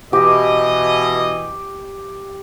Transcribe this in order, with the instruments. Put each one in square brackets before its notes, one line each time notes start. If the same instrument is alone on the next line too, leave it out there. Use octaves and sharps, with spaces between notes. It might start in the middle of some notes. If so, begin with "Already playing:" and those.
[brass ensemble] B2 E3 D#5 [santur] G4